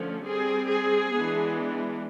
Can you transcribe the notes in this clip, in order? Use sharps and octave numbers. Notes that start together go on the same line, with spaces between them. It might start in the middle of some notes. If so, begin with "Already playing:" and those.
Already playing: D3 F3 A3 C#4
G3 C4 G#4
G#4
E3 G#3 B3 D4